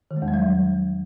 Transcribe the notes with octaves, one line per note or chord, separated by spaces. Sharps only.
D#3
G#3
E2
G3
F#3